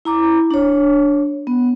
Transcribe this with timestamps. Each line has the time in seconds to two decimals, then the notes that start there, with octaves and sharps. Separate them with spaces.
0.05 E4 A#5 D6
0.51 D4 C#5
1.47 B3